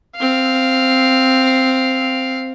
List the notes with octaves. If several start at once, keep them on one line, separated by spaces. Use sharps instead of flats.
C4 F5